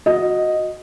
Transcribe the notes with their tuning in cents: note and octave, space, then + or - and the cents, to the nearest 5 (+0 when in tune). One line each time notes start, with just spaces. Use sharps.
F#4 -20 D#5 +0